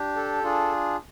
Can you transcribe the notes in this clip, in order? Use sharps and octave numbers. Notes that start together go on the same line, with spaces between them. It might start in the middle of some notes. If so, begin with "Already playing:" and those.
Already playing: D4 G4
A4
D4 F4 G#4